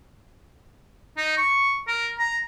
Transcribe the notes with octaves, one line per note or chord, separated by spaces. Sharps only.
D#4
C#6
A#4
A#5